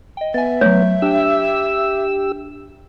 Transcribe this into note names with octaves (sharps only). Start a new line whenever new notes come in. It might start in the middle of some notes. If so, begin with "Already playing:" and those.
D#5 G5
B3 E5 G#5 A6
F#3 A3 C#5
D4 G4 G5 E6